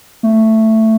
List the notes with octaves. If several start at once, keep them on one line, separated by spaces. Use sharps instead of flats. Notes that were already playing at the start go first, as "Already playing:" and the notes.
A3